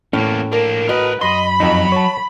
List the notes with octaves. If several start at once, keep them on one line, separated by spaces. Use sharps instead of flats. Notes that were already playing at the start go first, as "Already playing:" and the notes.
E2 A2 A#3 C#4
A#3 D4 A#4
F#4 A#4 B4 D#5 B5
F#2 D#5 B5 C6
F2 F#3 D#4
C#5 A5